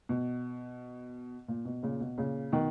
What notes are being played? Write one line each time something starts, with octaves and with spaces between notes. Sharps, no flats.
B2
A#2
B2
A#2 C#3
B2
A#2 C#3
B2 D#3